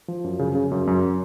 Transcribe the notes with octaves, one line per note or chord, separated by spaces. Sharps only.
F3
F#2
C#3
C#3
F#2
F#2